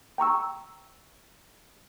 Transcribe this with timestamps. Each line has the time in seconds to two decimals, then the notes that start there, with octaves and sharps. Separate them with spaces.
0.18 G5 A#5 C#6 E6